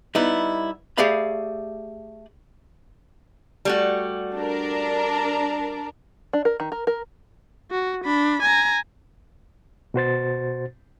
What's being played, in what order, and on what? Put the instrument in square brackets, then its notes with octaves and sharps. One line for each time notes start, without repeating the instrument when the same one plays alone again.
[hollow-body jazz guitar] G3 B3 D#4 E4
A3 G4 G#4 D5 F5 B5
[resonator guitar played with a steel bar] G3 A3 F#4
[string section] D4 A#4
[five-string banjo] D4
A#4
D#3
A#4
A#4
[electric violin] F#4
D4 B5
G#5 A#5
[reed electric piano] B2 F#4 C5 A6